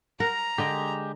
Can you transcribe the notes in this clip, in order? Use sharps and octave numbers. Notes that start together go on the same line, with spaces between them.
A#4 F#5 A#5
D3 G#3 G4 D#5 G5